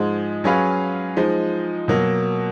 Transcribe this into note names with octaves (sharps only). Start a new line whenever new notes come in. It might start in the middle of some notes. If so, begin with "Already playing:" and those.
Already playing: G#2 F3 G#3
F#3 C#4 G#4 B4 F5
F3 G#3 D#4
B2 F#3 A#3